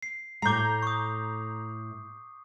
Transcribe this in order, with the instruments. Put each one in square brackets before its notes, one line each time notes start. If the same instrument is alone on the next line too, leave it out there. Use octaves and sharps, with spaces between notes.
[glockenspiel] C7
[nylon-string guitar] A2 A3 [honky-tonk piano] A#5 G6 [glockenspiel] D6 C7
[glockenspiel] C#6 D#6